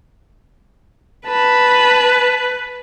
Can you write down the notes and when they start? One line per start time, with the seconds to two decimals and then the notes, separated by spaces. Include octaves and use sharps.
1.28 B4 A5 B5